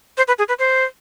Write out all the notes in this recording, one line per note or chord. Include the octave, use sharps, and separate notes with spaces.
C5
B4
G#4
B4
C5